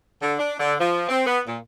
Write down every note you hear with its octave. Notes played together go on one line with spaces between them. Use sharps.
D3
D4
D3
F3
C4
B3
A#2